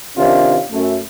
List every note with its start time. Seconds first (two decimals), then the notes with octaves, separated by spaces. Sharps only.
0.17 C3 D#3 C#4 D4 F4
0.72 F#2 A3